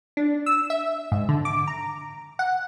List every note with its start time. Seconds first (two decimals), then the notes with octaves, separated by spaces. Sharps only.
0.17 D4
0.46 E6
0.70 E5
1.12 G#2
1.29 D3
1.45 D6
1.67 A#5
2.39 F#5